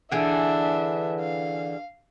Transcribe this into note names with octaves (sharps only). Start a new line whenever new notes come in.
D3 E3 D4 G#4 E5
F5